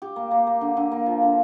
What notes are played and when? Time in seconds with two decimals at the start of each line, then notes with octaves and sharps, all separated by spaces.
0.02 G4
0.16 A#3
0.31 A#3
0.47 A#3
0.61 D3
0.77 D3
0.91 A#3
1.06 F3
1.22 D3